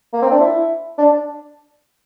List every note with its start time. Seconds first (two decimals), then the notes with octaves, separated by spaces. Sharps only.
0.13 A#3
0.22 C4
0.31 D4
0.40 E4
0.98 D4